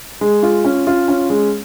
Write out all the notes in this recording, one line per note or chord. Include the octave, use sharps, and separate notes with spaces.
G#3
F4
C#4
F4
C#4
G#3